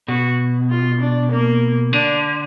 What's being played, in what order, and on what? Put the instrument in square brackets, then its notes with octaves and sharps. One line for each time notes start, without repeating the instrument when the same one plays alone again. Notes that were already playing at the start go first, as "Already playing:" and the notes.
[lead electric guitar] B2 [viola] F#4
[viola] F4
D4
A#3
[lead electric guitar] D3 [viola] D4